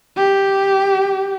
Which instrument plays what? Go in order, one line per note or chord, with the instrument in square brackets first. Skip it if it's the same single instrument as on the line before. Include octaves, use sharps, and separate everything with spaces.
[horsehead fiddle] G4